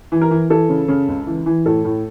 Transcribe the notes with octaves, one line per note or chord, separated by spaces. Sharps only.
E3
A#4
E3
E3 A4
C#3
C#3
C#2
E3
E3
A2 A4
A2